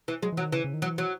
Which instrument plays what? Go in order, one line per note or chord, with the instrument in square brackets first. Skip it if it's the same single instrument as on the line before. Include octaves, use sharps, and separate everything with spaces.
[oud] E3
[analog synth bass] F#3 [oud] G#3
[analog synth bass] E3
[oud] F#3
[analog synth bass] D#3
[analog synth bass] C#3 [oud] E3
[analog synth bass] C#3
D#3
[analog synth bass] E3 [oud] F#3
[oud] F#3